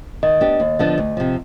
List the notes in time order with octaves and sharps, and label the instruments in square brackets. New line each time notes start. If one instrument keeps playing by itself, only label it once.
[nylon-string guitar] D#3 [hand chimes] D#5
[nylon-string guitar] B3 D4 G4
D#2
D3 F3 B3 D4
D2
C3 F3